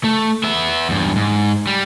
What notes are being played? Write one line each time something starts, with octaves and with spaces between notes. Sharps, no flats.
A3
B3 E5
E2 G2
G#2
G3